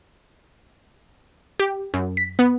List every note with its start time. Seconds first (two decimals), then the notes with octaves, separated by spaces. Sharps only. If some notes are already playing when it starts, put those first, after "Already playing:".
1.60 G4
1.94 F#2
2.17 B6
2.39 B3